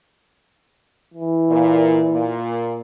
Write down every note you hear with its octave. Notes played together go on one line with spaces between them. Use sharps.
E3
A#2
A#2